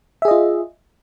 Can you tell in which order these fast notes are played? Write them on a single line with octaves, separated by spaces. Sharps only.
E5 G#4 D#5 F4